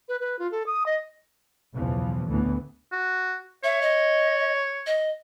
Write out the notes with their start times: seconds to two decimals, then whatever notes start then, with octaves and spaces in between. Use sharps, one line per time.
0.08 B4
0.20 B4
0.39 F4
0.51 A4
0.66 D#6
0.86 D#5
1.74 F#1 B1 E2 B2 E3 F3
2.29 A1 D2 A2 D3 E3 B3
2.92 F#4
3.64 C#5 E5
3.82 D#5
4.86 D#5